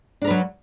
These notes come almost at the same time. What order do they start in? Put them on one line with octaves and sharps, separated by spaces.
D4 A#4 B4 F#3